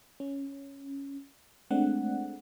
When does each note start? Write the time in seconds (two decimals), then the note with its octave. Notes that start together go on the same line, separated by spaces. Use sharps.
0.20 C#4
1.70 G#3 A3 C4 D4 F#5